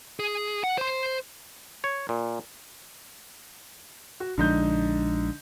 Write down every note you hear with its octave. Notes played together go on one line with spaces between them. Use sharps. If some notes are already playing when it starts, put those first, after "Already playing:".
G#4
F#5
C5 C6
C#5
A#2
F#4
A#1 D3 F3 G#3 D#4 G6